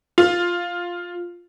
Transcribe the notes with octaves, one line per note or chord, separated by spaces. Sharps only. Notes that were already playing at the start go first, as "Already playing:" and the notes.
F4